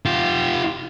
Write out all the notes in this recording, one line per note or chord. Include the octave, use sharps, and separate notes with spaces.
F4 G4